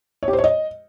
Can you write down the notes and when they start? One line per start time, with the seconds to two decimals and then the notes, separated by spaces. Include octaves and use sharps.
0.23 C#5
0.28 G4
0.33 C5
0.38 C#5
0.44 D#5